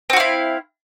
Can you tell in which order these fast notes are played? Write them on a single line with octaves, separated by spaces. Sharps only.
C4 F#4 F5 E4